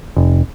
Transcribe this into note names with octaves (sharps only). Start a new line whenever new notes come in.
F1